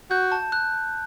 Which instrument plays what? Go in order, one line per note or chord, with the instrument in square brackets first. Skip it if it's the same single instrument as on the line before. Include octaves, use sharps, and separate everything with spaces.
[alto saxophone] F#4 [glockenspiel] G6
[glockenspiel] A5
F#6